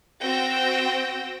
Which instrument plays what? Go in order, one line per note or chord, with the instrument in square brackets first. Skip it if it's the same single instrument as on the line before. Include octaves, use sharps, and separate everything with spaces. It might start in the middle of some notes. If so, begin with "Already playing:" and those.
[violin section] C4 F#4 G5 E6 A#6